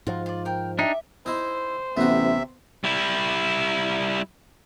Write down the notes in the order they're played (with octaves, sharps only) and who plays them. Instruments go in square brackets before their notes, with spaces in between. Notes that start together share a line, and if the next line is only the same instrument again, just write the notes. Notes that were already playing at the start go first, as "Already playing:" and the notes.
[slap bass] G#2 F3 [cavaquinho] F4 F#4
[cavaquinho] F4 D5
A#4 G5
[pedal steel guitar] D4 D#4 [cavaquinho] G4 [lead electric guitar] E5
[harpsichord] D#4 E4 [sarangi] C5
[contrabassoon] A1 [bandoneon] C3 E5 [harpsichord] B3 F#4
[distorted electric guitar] G3 E4